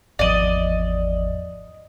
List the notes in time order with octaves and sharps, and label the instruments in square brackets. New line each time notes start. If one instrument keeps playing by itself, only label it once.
[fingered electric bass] G#1 E2 F3 [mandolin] D5 D#5